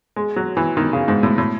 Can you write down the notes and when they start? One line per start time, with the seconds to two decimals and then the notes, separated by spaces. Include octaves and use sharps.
0.16 G#3
0.36 F#3
0.57 E3
0.77 D#3
0.93 C#3
1.08 G#2
1.23 A2
1.38 A2